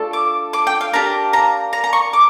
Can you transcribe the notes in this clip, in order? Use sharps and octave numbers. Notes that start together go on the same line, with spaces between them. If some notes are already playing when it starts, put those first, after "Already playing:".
Already playing: A3 D4 F4 A4
D6
D6
G5
F5
A#3 D4 G4 A#5
A#5
A#5
A#5
C#6
D6